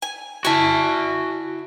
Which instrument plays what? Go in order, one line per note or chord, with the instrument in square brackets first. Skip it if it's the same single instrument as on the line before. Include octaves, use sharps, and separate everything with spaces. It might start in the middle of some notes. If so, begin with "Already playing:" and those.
[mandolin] G#5
[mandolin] E4 G#5 [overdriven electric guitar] F#4 A5